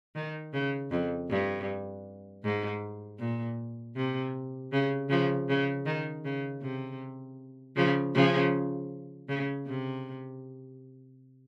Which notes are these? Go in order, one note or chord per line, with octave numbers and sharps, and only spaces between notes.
D#3
C#3
F2
G2
G#2
A#2
C3
C#3
C#3 F3
C#3
D#3
C#3
C3
C#3 F3
C#3 F3
C#3
C3